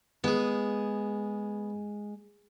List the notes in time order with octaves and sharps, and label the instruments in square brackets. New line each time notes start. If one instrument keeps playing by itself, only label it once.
[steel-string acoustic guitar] G#3 [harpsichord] B3 G#4